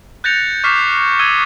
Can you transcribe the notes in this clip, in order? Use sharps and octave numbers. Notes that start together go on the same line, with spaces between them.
F#6 G6 A6 A#6 C#7 F7
C#6 D6 F6 B6 C7 E7
D#6 E6 G#6 D#7 G7